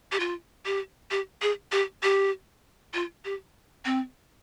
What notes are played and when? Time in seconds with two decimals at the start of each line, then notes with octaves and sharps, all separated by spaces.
0.12 G4
0.20 F4
0.66 G4
1.11 G4
1.42 G#4
1.72 G4
2.03 G4
2.94 F4
3.25 G4
3.85 C4